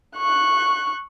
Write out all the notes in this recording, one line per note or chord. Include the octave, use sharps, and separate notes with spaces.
C#6 F#6